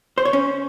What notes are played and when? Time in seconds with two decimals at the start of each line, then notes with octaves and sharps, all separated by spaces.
0.18 C5
0.25 C#5
0.33 C#4